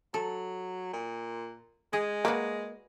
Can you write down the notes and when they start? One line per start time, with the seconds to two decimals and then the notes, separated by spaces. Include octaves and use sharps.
0.14 F#3 A4
0.93 A#2
1.93 G#3 G#4
2.25 A#3 F#4 B4 D5